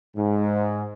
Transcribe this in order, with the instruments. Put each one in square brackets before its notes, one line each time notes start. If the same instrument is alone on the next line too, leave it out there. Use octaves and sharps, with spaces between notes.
[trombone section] G#2